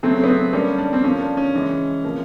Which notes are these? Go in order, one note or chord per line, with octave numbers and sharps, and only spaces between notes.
C#3 F#3 A3 C4
B3
C4
D3 G3 A#3 C#4
D4
C4
D3 F3 A#3 C#4
D4
C#4
C#3 E3 G#3
C3 F3 A#3